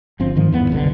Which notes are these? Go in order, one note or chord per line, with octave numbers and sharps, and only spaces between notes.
G1 F3 C4
G#2 D#3 F3
E2 G2 E3 B3
F#1 C2 B2 D3